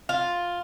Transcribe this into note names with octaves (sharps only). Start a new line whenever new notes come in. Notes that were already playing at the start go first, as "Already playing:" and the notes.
F4